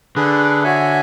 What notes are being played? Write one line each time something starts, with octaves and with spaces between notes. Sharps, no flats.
D3 D4 G#4 B4
F#4 C#5 E5 G#5